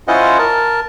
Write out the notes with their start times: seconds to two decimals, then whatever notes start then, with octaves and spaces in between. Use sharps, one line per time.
0.08 C#4 E4 F4 C5 D#5 F#5
0.39 A#4 A5